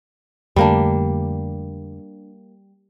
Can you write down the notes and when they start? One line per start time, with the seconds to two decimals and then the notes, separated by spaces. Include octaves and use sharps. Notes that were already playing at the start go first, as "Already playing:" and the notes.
0.56 F2 D3 G3 A3 A#3 D4